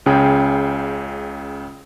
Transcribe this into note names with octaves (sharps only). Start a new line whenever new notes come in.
C#2 C#3 G#4 G5